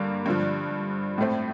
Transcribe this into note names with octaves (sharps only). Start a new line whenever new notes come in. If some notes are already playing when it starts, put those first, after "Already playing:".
Already playing: G2 D3 A#3
G2 D3 F3
A2 A3 C4